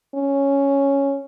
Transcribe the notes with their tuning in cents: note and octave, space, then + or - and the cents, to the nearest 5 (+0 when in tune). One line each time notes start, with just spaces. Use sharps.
C#4 +0